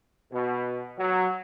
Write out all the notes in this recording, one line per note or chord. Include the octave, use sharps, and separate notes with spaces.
B2
F#3